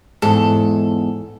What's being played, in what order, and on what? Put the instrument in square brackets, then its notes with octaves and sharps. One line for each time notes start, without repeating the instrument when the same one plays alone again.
[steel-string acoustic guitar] E2 G#2 [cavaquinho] A4